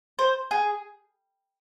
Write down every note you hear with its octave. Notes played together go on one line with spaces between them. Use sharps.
C5
G#4